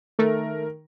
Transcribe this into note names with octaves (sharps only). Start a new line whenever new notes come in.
D#3 A3 A#4